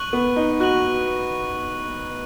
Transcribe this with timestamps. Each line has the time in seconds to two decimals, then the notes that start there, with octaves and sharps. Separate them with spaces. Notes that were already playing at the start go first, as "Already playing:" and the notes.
Already playing: C#6 F#6 D#7 F#7
0.13 B3
0.36 D#4
0.60 F#4 C#6 F#6 D#7 F#7